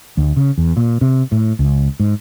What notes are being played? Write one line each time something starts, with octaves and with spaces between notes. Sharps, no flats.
D2
C#3
E2
A#2
C3
A2
C#2
G#2